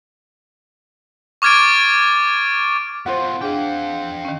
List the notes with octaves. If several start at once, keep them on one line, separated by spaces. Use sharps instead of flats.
C#6 D6 F6 G#6 A6 D7
B3 F4 C5 F#5
D4 G#4 F5 G5
D#3 C#4